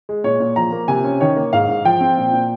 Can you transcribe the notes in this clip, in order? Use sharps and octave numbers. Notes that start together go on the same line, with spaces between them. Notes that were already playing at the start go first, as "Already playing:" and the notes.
G#3
A#2 C#5
A#2
F3 A#5
A#3
C3 G#5
C#4
D#3 C#5
A#3
G#2 F5
G#2
F3 G5
C4
A#2
A#2